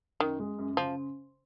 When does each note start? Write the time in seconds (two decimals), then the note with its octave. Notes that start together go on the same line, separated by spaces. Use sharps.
0.20 F#2 D#3
0.40 G#3
0.59 F#2
0.77 C#3 F3